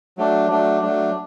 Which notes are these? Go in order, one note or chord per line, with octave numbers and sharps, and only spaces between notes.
F#3 A3 D4
F#3 A3 D4
F#3 A3 D4